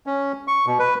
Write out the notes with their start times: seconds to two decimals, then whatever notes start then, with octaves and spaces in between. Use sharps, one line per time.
0.07 C#4
0.48 C#6
0.66 B2
0.79 B4